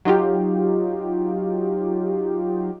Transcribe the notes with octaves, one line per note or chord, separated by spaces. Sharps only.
F#3 D#4 F4 G4